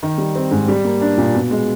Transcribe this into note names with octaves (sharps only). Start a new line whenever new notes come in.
D#3
G3
C4
G#2
G3
A#3
D4
A#2
B2
G#3